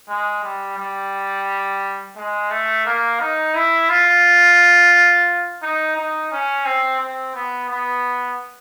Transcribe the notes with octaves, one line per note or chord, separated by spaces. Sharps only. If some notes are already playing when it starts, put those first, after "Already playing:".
G#3
G3
G3
G#3
A3
A#3
D#4
E4
F4
D#4
D#4
C#4
C4
C4
B3
B3